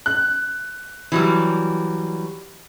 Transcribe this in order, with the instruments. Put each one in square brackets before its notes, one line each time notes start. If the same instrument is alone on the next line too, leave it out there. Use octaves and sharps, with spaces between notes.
[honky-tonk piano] F#6
[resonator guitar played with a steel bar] E3 F#3 G3